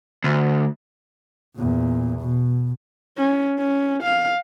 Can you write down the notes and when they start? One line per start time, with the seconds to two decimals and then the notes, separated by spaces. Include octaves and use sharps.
0.24 D2
1.56 E2 A#2
2.20 B2
3.18 C#4
3.59 C#4
4.03 F5